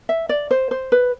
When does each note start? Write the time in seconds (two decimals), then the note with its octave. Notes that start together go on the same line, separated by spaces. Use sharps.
0.09 E5
0.29 D5
0.51 C5
0.71 C5
0.92 B4